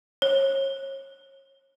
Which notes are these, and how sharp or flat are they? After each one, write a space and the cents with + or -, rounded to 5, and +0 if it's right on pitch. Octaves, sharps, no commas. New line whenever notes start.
C#5 -35